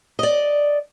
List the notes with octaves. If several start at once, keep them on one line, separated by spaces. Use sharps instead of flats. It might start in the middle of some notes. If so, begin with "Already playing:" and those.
D5 D#5